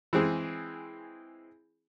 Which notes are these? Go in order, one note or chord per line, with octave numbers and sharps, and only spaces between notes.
E3 G#3 C4 G#4